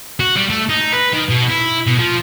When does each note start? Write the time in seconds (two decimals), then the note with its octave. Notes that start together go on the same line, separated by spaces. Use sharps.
0.20 F#4
0.36 G3
0.50 A3
0.70 D#4
0.93 B4
1.14 D#3
1.30 B2
1.50 E4
1.87 B2
1.99 F3